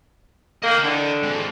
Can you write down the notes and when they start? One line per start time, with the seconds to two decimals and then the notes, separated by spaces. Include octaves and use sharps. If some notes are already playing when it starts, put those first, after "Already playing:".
0.62 A#3 D#5 G5
0.84 D3
1.23 G#3 C4